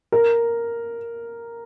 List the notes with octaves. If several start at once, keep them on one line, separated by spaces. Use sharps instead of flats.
A#4